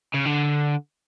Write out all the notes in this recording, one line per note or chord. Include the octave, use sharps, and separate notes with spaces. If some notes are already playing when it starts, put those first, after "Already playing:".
C#3
D3